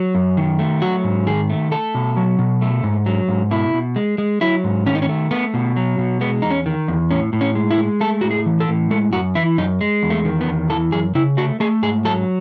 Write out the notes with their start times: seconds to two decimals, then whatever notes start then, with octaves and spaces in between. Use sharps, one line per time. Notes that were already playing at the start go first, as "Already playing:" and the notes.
Already playing: F#3
0.15 F#2
0.37 D#3
0.59 A3
0.82 F#3 F#4
1.04 G#2
1.27 D#3 G#4
1.49 A3
1.71 A3 A4
1.94 B2
2.17 F#3
2.39 B2
2.61 A3
2.84 G#2
3.06 F#3
3.28 G#2
3.51 B2 E4
3.74 B2
3.96 G#3
4.18 G#3
4.41 F#3 E4
4.64 G#2
4.86 D#3 C#4
4.95 D#4
5.02 C#4
5.09 A3
5.31 A3 B3
5.54 B2
5.76 F#3
5.98 B2
6.21 G#3 B3
6.42 E2 D#4
6.50 C#4
6.66 D#3
6.88 E2
7.11 A2 C#4
7.33 A2
7.41 C#4
7.55 G#3
7.71 E4
7.78 G#3
8.01 A3 A4
8.21 A2 F#4
8.31 G#4
8.46 E3
8.60 A4
8.68 A2
8.91 G#3 A4
9.13 F#2 F#4
9.35 E3 E4
9.58 F#2 D#4
9.81 G#3
10.03 E2
10.10 A3
10.25 D#3
10.41 B3
10.47 E2
10.70 E3 A4
10.92 F#2 G#4
11.15 C#3 E4
11.37 A3 F#4
11.60 A3 G#4
11.83 G#2 G#4
12.05 F#3 A4